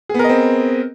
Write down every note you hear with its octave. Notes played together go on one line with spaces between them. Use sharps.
B3 C4 G#4 A#4 D#5